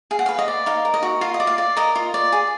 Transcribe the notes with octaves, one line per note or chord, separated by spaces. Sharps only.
G#4 F5
F#5
F5
B4
D#5
D5
D#4 F5
A#4
D#5
F#4
F4 F5
D#5
D5
F5
D5
A#4 D#5
F4
D5
G#4